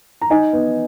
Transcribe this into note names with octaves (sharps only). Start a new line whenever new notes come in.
A#5
D#4 G#5
B3